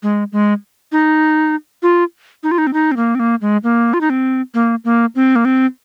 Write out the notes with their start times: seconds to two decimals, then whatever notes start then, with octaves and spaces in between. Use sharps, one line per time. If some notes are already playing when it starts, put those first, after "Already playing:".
0.03 G#3
0.32 G#3
0.92 D#4
1.83 F4
2.43 D#4
2.51 F4
2.58 D#4
2.67 C4
2.73 D#4
2.92 C4
2.97 A#3
3.15 C4
3.20 A#3
3.42 G#3
3.64 A#3
3.94 F4
4.01 D#4
4.10 C4
4.54 A#3
4.85 A#3
5.15 C4
5.36 A#3
5.45 C4